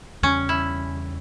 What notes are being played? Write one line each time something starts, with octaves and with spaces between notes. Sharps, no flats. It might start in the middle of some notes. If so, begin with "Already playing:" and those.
E2 C#3 G3 C#4
E4